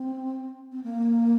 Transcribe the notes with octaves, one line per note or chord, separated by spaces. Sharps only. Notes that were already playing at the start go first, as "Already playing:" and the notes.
Already playing: C4
C4
A#3